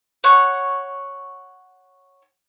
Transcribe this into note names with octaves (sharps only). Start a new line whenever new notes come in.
C#5 F#5 C#6